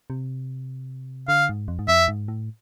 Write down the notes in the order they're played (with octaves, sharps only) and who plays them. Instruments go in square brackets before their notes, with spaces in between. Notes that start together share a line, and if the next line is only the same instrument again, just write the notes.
[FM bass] C3
[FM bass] D3 [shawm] F5
[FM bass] G#2
F2
G#2
[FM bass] F2 [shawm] E5
[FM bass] G#2
A2